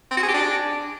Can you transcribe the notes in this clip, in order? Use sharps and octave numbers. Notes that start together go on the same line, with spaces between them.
C4
F#4
G#4
G4
D4